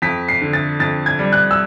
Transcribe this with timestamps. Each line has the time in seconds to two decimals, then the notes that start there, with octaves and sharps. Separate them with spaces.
0.02 F2 B6
0.28 C7
0.41 D3
0.53 A6
0.79 F2 A6
1.06 G#6
1.19 G3
1.33 F#6
1.51 E6